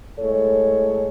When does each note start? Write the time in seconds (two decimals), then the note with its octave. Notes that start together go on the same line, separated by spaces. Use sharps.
0.18 A2 G#3 A4 C#5